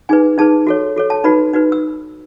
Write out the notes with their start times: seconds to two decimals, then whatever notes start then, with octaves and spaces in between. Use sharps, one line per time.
0.09 D#4 G#4 B4 G#5
0.38 D#4 G#4 B4 A5
0.67 F#4 A4 C#5
0.96 F#4 A4 C#5
1.10 A5
1.24 D#4 F#4 B4 B5
1.53 D#4 F#4 B4
1.72 E6